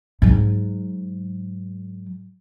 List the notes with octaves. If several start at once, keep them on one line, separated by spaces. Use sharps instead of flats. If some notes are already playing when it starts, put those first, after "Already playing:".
G#2 F#3